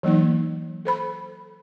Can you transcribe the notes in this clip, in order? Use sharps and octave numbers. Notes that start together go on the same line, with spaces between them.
E3 F#3 A#3 D#4
A4 C5 B5